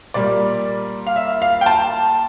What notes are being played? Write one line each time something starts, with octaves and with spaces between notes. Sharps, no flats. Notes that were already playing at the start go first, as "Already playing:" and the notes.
A#2 G3 A#3 D5
F5
E5
F5
G5
A5